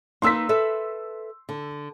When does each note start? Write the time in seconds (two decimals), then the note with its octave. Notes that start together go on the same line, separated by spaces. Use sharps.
0.22 A#3 D#4 B4 C6 E6 B6
0.49 A4 B4 E5
1.49 D3